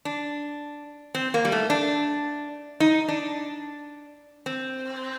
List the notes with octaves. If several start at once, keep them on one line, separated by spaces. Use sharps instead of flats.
D4
C4
A#3
G3
A3
D4
D#4
D4
C4